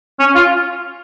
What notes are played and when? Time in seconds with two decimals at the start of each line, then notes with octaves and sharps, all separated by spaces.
0.19 C#4
0.35 F4